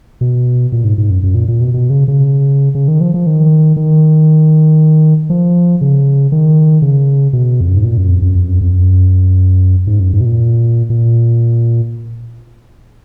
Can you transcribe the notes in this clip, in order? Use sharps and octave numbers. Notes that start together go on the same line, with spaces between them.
B2
A#2
G#2
G#2
F#2
F#2
A#2
A#2
B2
B2
C#3
C#3
C#3
D#3
F3
F3
D#3
D#3
F3
C#3
D#3
C#3
B2
F2
F#2
G#2
A#2
F#2
F2
F#2
F2
F#2
F2
F#2
G#2
F#2
G#2
B2
A#2
A#2